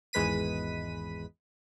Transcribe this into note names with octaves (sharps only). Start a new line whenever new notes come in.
G#1 E2 G#3 B4 B6 D#7